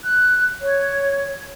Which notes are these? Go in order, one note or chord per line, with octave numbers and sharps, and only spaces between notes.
F#6
C#5